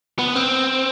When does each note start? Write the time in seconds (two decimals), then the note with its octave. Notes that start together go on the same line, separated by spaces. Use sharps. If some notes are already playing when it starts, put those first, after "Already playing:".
0.19 B3
0.35 C4